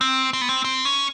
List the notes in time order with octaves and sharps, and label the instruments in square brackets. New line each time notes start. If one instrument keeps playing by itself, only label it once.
[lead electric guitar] C4
C4
B3
C4
C4
C#4